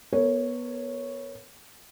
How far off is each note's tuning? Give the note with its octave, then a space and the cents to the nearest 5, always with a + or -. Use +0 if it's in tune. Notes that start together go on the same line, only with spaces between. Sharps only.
B3 -15 A#4 -40 C#5 +0